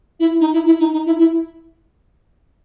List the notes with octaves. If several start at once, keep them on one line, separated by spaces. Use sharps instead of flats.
E4
D#4
E4
E4
D#4
D#4
E4
E4